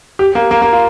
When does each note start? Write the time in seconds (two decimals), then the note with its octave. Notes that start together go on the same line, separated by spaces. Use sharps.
0.19 G4
0.35 A#3
0.51 A#3
0.62 A#3
0.73 F4